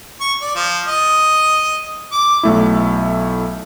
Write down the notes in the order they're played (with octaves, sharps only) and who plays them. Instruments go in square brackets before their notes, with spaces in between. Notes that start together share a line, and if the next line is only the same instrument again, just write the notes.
[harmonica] C#6
D5
F3
D#5
D6
[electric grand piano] B1 A3 E4